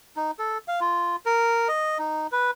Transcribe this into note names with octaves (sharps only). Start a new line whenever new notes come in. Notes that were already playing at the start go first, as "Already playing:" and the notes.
D#4
A4
F5
F4
A#4
D#5
D#4
B4